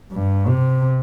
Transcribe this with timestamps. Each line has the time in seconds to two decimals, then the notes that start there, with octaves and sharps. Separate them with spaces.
0.12 G2
0.48 C3